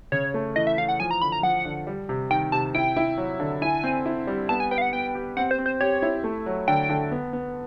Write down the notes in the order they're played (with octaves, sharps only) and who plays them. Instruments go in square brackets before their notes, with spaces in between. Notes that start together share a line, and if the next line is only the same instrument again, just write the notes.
[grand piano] C#3 [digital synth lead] C#5
[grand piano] A3
[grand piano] E3 [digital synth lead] D#5
[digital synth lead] E5
[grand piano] E3 [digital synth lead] F5
[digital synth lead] F#5
[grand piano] F3 [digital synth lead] G#5
[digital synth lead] A#5
[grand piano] D3 [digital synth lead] B5
[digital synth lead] A#5
[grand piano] F3 [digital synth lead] F#5
[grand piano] D3
G3
C3
[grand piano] D#3 [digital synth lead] G5
[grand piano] C3 [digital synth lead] A5
[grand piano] E4 [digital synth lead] G5
[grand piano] E4
F#3
D3
[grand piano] E4 [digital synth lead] G#5
[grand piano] C4
E4
G3
[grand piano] B3 [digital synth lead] A5
[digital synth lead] G#5
[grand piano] B4 [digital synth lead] G5
[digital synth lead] F5
F#5
[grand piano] B3 [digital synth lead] G5
[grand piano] G4
[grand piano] C4 [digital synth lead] F#5
[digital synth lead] C5
[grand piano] C4
[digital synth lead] C5
[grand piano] G4 [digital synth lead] C#5
[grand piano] E4
A3
F#3
[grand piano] D3 [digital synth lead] G5
[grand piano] D3
B3
B3